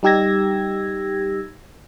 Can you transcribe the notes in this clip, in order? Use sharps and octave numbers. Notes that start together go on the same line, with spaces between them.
G3 D#4 G4 E6 G#6 A#6